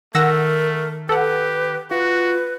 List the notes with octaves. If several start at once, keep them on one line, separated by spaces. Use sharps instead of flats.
D#3 A3 A#4 F#5 E6 A#6
G4 A4 B4 F#5
F4 F#4 B4